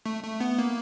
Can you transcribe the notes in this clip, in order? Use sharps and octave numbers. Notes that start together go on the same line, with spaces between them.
A3
A3
B3
A#3